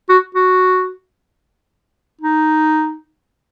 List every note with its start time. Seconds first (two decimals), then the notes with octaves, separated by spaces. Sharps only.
0.09 F#4
0.35 F#4
2.21 D#4